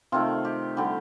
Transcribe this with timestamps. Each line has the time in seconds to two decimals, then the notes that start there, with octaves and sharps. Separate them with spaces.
0.12 C3 D#3 A3 F4
0.45 G4
0.77 D3 G3 G4